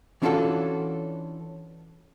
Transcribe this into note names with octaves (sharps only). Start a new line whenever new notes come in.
E3 C#4 D4 F4 F#4 A4